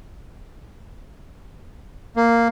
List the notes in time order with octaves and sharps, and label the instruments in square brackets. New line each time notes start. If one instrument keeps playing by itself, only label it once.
[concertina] A#3